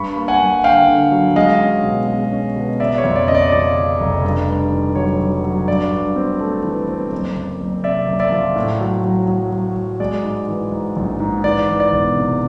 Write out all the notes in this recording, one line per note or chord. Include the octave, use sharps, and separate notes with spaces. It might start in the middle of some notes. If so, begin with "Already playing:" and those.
Already playing: G2 B5 C#6
A#3
F#5 G#5
G2
D3 F5 G5
D3
F#3
G#3 D#5 F5
C#4
B2
G#3
C#4
B2
C#3 D5 E5
C#5
F2
D5
C#3 D#5
D5
F3 D5
C#3
F1
G2
G2
D#3
F#3 C#5
F#3
F#3
G2 D5
G2
C4
A3
E3
C4
F#1
F#1
F#1
C3 D5 E5
F#1
D5 E5
F3
A2
F#3
F#3
F#3
F#3
F#3
G#3 D5
G#2
E3
G#2
A#1
G#2
E3 D5
E3
D5
E1
C3